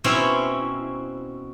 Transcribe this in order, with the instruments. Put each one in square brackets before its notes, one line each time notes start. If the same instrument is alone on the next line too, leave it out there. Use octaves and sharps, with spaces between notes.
[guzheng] B2 C4 C#4 E4